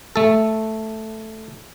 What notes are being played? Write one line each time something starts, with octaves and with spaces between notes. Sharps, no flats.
A3 A4